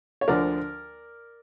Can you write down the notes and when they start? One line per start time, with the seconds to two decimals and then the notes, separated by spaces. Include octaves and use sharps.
0.21 C#5
0.28 D2 D3 F3 A#4 D5